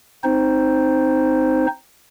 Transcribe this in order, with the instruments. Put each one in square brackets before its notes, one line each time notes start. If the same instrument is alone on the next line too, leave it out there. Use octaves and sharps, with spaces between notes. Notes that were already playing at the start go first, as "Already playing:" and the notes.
[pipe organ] C4 D#4 C5